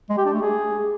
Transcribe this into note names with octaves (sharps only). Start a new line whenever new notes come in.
G#3
G4
D4
A3
G#4